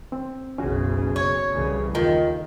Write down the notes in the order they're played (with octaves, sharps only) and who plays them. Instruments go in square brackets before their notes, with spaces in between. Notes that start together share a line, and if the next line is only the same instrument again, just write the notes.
[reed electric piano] C4
[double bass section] F#1 B1 C#3 [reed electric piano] C#4 F#4
[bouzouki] C#5
[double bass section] C2 C#3 E3
[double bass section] D#2 [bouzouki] D#3 [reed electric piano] F4